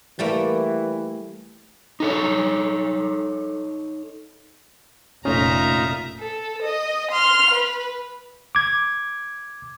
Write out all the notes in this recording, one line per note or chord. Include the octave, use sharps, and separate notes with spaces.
E3 G3 A3 A#3
D#4 A4 C#5
F1 A#2 A3 C#4 D#4 F4 E5 A#5
A4
D#5
C6 F6
B4
D6 G#6